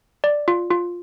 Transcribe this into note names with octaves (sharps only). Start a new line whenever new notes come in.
D5
F4
F4